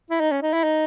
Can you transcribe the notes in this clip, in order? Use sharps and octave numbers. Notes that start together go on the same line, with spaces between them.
E4
D#4
C#4
D#4
E4
D#4